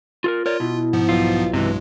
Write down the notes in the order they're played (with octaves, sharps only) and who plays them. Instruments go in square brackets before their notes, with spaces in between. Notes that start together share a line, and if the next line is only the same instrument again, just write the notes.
[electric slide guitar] F4 A4 A#4
[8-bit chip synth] F4 [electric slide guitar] A#4 C#5 D5
[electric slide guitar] B2 [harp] E4
[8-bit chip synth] G#2 F3 B3
[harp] B1 E6 [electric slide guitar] F4
[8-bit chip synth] G2 G#3 [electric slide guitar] C3 E3